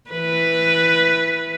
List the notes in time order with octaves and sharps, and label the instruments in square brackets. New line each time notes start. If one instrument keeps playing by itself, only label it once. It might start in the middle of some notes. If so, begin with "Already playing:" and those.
[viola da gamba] E3 B4